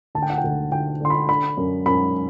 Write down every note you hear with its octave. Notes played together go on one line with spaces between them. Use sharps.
D2 A5
G5
F#5
G5
D2
D2 G5
D3 C6
B5
D3 B5
F#2
F#2 B5